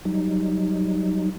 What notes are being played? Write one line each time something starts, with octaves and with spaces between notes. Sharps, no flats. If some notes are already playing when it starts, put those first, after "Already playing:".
F#3 G3 D#4